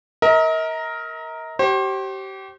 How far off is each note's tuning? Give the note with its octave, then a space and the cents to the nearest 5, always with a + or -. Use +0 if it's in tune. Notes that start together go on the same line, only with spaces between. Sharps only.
A#4 +0 D#5 +45
G4 -30 C5 +35